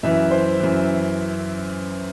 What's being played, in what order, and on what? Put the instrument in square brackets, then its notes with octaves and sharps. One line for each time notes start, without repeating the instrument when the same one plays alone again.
[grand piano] F#2 E3 E5
C5
F#2 E3